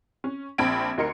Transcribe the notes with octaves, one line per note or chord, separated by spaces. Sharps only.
C#4
A#1 C4 A5 B5 G#6 D7
D2 D#4 A#4 C6 C#7